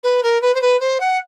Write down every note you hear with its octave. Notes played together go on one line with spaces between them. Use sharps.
B4
A#4
B4
C5
B4
C5
F#5